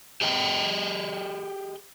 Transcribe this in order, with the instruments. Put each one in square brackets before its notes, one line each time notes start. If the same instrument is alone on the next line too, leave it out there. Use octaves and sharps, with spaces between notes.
[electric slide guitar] G4 G#4 D#5 G5